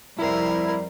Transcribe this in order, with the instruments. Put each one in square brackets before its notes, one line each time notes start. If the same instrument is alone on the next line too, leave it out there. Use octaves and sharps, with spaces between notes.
[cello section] F2 C3 C5 [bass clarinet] G3 [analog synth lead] E4 [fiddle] A#4